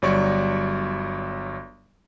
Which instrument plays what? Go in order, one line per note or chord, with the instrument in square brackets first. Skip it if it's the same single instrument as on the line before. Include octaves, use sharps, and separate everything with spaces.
[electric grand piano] G1 F#3 G3 C#5 D5 C#6